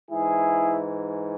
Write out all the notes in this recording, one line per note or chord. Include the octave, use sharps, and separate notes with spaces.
G#2 E3 E4 G#4